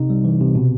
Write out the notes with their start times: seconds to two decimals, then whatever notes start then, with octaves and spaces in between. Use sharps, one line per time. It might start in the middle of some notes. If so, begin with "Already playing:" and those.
Already playing: C3 D#4
0.10 G3
0.25 E3
0.41 C3
0.55 B2